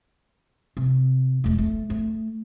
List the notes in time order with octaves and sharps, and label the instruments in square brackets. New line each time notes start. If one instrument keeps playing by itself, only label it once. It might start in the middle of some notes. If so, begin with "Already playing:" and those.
[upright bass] C3
E1 A3
A3
A3